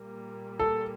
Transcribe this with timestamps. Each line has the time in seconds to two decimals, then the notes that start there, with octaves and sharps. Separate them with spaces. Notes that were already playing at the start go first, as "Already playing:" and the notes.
Already playing: A#2 G3 A#3
0.59 A4